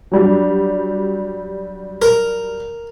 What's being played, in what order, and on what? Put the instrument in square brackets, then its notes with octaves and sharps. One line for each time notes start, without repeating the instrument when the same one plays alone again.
[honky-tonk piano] F#3 G3 D4
[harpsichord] A#4